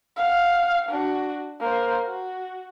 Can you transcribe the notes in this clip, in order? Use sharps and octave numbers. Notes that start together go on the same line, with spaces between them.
F5 F#5
D4 F#4
A#3 C5
F#4